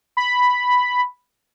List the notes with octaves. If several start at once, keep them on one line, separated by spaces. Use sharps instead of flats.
B5